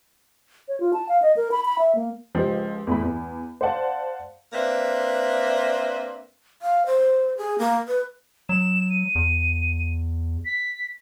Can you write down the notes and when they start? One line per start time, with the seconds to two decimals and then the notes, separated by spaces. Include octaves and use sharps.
0.68 C#5
0.80 F4
0.94 A5
1.09 F5
1.22 D#5
1.37 A#4
1.51 B5
1.65 B5
1.78 E5
1.95 A#3
2.35 C#2 F3 G#3 G4
2.87 E2 A2 B5
3.02 E2
3.61 C5 D5 F5 F#5 A5
4.53 A#3 C4 D4 B4 E5
6.62 F5
6.86 C5
7.37 G#4
7.59 A#3
7.88 B4
8.49 F#3 E7
8.90 D#7
9.15 E2
10.45 B6